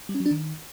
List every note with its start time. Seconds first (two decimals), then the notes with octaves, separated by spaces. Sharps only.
0.09 G3
0.15 C#4
0.20 F#3
0.26 D4
0.31 D#3